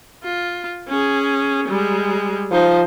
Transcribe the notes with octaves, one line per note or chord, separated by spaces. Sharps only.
F4
C#4 G#4
G3 G#3
F3 D#4 C5